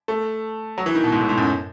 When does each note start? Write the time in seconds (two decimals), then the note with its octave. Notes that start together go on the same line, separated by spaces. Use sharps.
0.08 A3
0.78 F#3
0.86 E3
0.95 D#3
1.04 B2
1.12 G#2
1.21 A2
1.29 G#2
1.38 F#2